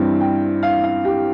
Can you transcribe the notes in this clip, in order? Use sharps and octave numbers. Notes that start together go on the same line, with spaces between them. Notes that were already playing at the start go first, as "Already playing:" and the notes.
Already playing: G2 E3 G3 C4
G5
F5
F5
G4